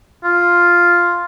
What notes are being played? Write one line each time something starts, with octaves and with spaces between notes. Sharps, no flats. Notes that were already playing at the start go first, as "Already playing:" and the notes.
F4